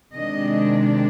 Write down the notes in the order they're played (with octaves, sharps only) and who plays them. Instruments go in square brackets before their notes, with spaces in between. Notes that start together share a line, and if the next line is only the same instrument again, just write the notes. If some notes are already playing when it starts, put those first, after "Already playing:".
[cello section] C3 D#3 G#3 D4 D#5